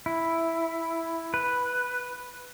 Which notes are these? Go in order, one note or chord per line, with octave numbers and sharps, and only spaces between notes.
E4
B4